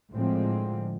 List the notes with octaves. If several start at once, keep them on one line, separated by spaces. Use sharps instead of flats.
A2 D3 F3 G#3 C4